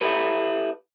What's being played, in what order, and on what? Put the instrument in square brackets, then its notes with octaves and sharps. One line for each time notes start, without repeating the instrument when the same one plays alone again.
[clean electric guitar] E4 G4 A4 B4